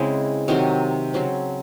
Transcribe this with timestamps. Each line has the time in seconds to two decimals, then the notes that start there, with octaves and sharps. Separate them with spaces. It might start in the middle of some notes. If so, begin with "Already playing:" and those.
Already playing: C#3 G#3 C4 E4
0.48 C3 D#3 F#3 C4
1.14 C#3 F#3 C4